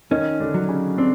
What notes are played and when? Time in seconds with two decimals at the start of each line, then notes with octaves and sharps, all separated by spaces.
0.11 D#3 C#4 D#4
0.40 D3 D4
0.54 F#3
0.69 C#3 C#4
0.97 D3 C4 D4